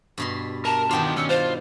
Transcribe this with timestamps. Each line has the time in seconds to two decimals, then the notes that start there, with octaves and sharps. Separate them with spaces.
0.18 G2 B2 C6
0.65 A#4 A5
0.91 D#3 B3 D4 F4 G5
1.17 C#4 E6
1.29 F4 C5